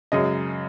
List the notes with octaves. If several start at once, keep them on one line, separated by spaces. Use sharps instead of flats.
F#2 C#3 G#3 D#5